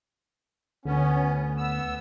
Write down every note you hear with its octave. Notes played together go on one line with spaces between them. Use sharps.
D2 B3 C#4
B3 E6